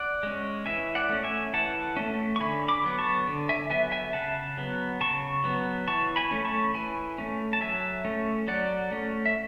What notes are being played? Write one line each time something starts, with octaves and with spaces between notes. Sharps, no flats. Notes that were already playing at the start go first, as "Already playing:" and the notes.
Already playing: D5 F#5
G#3 C#4
E3 E5 G#5
D5 F#5
A3 C#4
E5 G#5
E3 F#5 A5
A3 C#4
C#6
D3 G#5 B5
B5 D6
F#3 B3
A5 C#6
D3
E5 G#5
F#3 B3 E5 G#5
E5 G#5
C#3 F#5 A5
F#3 B3
C#3 A5 C#6
F#3 B3
E3 A5 C#6
G#5 B5
A3 C#4
A5 C#6
E3 G#5 B5
A3 C#4
A5
F#3 E5 G#5
A3 C#4
F#3 D5 F#5
A3 C#4
E5